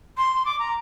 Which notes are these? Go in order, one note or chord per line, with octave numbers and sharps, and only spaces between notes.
C6
D6
A#5